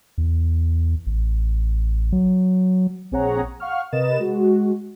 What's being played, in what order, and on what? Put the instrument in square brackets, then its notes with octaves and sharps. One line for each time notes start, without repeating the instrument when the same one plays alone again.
[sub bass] E2
A1
F#3
[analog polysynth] A#1 C4 G#4 C#5 F#5 A#5
F5 F#5 C#6 F6
C3 A#4 B4 D#5 A6 E7
G#3 F#4